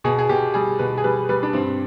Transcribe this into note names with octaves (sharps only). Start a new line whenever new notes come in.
B2 G#4
G#4
B2 G4
G3 G#4
B2 B4
G#4
G3 B4
G3 B4
D4
G2 C4